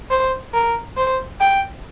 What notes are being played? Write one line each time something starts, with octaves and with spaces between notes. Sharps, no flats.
C5
A#4
C5
G5